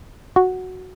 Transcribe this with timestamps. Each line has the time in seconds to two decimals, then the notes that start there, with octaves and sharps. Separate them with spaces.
0.36 F#4